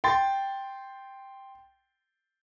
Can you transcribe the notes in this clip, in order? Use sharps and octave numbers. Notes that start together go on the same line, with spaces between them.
G5 C6 A6